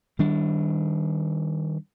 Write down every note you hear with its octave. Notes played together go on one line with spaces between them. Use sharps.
D#3 G3 D4